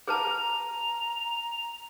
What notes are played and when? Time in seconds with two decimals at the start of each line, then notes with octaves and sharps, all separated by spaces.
0.08 G#4 B4 A5 A#5